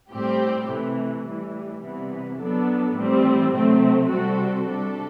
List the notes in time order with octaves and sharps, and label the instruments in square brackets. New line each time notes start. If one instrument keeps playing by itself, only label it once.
[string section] A2 G3 C4 G4
C3 E3 A3
A2 E3 G3
C3 E3 G3 B3
F#3 B3 D4 A4
A2 E3 G3 C4
C3 F#3 A3 C4
C3 G3 C4 F#4 A4
C3 G3 D4 A4